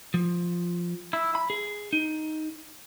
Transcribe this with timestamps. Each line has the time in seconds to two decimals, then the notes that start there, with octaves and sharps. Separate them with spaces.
0.14 F3
1.13 E4
1.35 B5
1.50 G#4
1.93 D#4